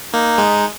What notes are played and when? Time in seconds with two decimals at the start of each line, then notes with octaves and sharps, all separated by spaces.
0.13 A#3 D#4
0.38 G#3